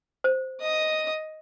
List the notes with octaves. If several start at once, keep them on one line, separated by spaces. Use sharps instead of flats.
C5
D#5 D#6